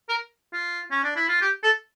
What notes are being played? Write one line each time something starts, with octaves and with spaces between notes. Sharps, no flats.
A#4
F4
C#4
D4
E4
F4
G4
A4